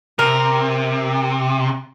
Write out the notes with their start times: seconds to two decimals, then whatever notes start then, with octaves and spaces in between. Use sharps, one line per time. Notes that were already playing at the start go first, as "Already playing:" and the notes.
0.19 C3 A#4